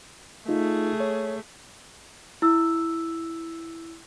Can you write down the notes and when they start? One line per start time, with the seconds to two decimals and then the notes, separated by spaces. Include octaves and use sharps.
0.49 A3 D#4 F4 G#4
1.00 C#5
2.42 E4 E6